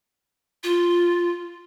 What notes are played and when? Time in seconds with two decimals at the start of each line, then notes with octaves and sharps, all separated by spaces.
0.64 F4